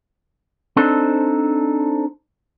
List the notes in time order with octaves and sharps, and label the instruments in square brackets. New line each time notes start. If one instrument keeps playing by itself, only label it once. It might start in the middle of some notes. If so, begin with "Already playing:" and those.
[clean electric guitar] C4 D4 D#4 A4 C5